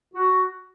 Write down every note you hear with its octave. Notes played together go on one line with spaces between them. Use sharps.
F#4